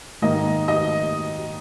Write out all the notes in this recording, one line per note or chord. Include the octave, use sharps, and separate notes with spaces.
G#2 D#3 A#3 D#5
D#5